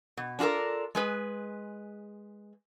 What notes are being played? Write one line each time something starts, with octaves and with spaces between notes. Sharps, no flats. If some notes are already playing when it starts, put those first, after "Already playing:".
B2
D4 F4 F#4 A4 A#4
G#3 G#4 B4